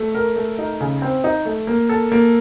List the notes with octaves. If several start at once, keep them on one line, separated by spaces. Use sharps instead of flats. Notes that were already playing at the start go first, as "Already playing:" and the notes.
Already playing: A3
A#4
A3
D#4
C#3
C4
D#4
A3
A#3
A4
A#3